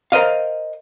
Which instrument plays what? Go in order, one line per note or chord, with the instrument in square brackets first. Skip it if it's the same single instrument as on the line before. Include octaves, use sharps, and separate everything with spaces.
[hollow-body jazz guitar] A#4 C5 D#5 F5